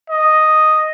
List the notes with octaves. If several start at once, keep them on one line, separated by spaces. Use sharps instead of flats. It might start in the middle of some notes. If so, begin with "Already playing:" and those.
D#5